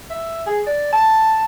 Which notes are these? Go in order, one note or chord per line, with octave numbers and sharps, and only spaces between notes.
E5
G#4
D5
A5